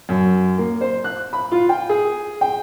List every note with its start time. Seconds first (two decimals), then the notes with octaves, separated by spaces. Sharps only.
0.09 F#2
0.58 A#3
0.81 C5
1.04 F#6
1.33 B5
1.51 F4
1.69 G5
1.89 G#4
2.41 G5